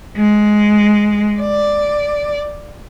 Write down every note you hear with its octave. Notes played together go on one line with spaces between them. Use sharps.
G#3
D5